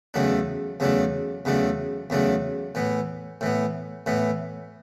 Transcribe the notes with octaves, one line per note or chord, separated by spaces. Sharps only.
E2 C#3 F#3 A3 D4
E2 C#3 F#3 A3 D4
E2 C#3 F#3 A3 D4
E2 C#3 F#3 A3 D4
A2 E3 B3
A2 E3 B3
A2 E3 B3